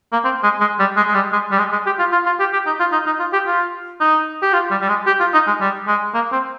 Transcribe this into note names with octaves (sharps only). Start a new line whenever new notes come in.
A#3
C4
G#3
G#3
G3
G#3
G#3
G3
G#3
G3
G#3
G#3
G4
F4
F4
F4
G4
G4
D#4
F4
D#4
D#4
F4
G4
F4
D#4
G4
F4
G3
G3
G#3
G4
F4
D#4
G#3
G3
G#3
A#3
C4